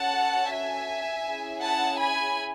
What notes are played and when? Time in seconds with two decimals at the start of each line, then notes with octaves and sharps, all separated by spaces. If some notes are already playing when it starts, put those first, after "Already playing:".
Already playing: C#4 F#4 A4 F#5 A5
0.52 E5 G#5
1.26 C#4 E4 G#4
1.62 F#5 A5
1.99 G#5 B5